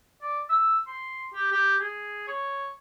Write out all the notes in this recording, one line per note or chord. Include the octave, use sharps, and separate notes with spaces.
D5
E6
C6
G4
G4
G#4
C#5